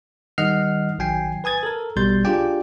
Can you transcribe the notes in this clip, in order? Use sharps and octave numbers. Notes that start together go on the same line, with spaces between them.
D#3 G3 D#5 F#5 F6 C7
A#1 D#3 F#3 G5 G#5 C7
B4 G#5 D#6 G#6 A6
A4 A#4
A#1 B2 G3 C6 G6 A6
D4 F4 G4 G#4 D5 G5